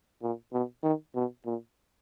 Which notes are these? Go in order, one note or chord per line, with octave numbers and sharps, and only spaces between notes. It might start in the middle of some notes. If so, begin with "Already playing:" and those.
A#2
B2
D#3
B2
A#2